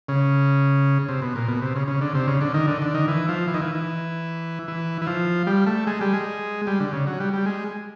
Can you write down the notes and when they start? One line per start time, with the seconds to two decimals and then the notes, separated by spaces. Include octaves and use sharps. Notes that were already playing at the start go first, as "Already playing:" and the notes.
0.09 C#3
1.08 C3
1.22 B2
1.36 A#2
1.48 B2
1.62 C3
1.75 C#3
1.88 C#3
2.01 D3
2.15 C3
2.27 C#3
2.41 D3
2.54 D#3
2.68 D3
2.82 D3
2.94 D#3
3.08 E3
3.28 F3
3.48 E3
3.54 D#3
3.62 E3
3.75 E3
4.68 E3
5.02 E3
5.07 F3
5.47 G3
5.67 A3
5.87 G#3
6.01 G3
6.13 G#3
6.67 G3
6.80 D3
6.93 C#3
7.07 F#3
7.20 G3
7.33 G3
7.46 G#3